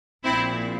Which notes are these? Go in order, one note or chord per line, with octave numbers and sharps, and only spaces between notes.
A#1 A#2 C4 E4